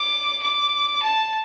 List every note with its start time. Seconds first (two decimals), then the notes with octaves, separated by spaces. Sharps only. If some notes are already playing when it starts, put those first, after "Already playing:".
Already playing: D6
0.42 D6
1.02 A5